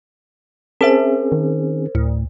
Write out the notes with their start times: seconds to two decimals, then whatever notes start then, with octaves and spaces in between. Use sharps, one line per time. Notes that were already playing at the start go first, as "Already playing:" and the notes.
0.81 C4 C#4 G#4 A#4 C5 E5 A5
1.32 D#3
1.95 D2 A2